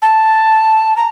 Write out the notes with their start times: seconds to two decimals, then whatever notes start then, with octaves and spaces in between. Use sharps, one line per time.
0.02 A5
0.96 A#5